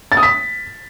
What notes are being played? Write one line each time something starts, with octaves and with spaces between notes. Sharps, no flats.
A6
D#6
B6